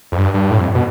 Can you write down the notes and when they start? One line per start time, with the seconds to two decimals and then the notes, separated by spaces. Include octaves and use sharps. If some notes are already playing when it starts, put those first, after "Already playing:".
0.12 F2
0.18 G2
0.34 G2
0.51 A2
0.59 F2
0.75 B2